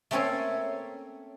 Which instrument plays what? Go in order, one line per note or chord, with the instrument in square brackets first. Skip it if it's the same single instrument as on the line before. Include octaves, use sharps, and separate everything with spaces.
[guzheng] A3 A#3 C4 C#4 A4 C#5